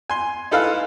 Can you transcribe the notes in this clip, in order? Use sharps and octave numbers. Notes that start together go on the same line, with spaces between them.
G#5 C6
D#4 E4 A4 B4 F5